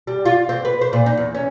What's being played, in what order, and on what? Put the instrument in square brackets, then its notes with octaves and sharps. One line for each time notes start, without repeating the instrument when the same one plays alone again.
[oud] G3
F4
C4
B4
C5
A#2
D#4
E2
C#4